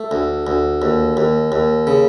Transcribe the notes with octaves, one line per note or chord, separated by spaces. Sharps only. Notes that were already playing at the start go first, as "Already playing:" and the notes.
Already playing: A3
D2
D2
D#2
D#2
D#2
C#3